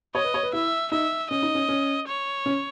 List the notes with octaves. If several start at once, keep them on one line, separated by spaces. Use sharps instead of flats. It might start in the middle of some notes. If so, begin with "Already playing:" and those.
C#5 D#5
B4
C#5
B4
E4 E5
D#4 E5
C#4 D#5
D#4
C#4
C#4
C#5
C#4